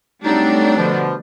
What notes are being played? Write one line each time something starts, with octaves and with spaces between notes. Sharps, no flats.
F#3 G3 A3 C4 D4 D#4
B2 D3 F3